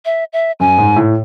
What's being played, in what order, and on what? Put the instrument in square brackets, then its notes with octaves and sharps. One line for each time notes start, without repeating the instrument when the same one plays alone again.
[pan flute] E5
E5
[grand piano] F#2 [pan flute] G#5
[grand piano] G#2
A2